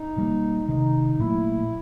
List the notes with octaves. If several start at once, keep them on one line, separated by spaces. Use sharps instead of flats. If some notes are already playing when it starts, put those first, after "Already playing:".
Already playing: D#4
B2 G3 A#3
C3 D#3 G#3 D#4
A#2 F#3 A3 E4